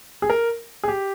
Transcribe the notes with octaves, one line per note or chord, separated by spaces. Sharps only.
G#4
A#4
G#4
G4